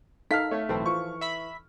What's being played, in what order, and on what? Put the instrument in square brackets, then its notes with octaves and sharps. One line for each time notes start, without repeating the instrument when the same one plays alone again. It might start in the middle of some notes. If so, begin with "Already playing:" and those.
[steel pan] D#4 A4 F5 [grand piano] F6 B6
[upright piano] A3 [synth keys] C#5
[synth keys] B1 C4 [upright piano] A2 [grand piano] E3 [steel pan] A4
[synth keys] F3 [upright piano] C#6
[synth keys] E5 B5 B6